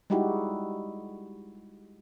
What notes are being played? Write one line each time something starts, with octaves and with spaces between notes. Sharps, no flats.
G3 G#3 D#4 E4 F#4 G4